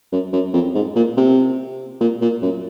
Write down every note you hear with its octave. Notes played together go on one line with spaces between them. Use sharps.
F#2
F#2
F2
G#2
A#2
C3
A#2
A#2
F#2